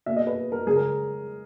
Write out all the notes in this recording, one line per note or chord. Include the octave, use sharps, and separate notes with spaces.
B2 A#3 E5
D#5
B4
A#4
C#3 G#3 G#4
A#4